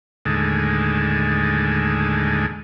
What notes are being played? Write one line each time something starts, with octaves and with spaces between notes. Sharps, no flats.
D#2 A2 D3 G#3